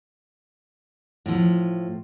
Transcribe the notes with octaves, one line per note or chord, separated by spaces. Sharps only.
A2 F3